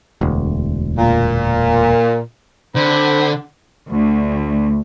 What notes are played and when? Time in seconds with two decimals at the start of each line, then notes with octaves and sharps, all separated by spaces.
0.21 E1 D2
0.98 A#2
2.76 D3 C4 C5 B5
3.89 D2